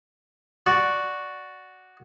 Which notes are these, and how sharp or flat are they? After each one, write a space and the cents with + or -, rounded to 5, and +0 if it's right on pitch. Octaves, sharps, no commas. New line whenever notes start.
F#4 +0 D5 +0